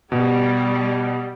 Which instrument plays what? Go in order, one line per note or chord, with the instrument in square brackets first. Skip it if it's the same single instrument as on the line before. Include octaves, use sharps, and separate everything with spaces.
[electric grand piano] B2 [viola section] G3